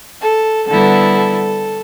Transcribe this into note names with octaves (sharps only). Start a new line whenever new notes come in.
A4
D3 G3 B3 E4 A4
A4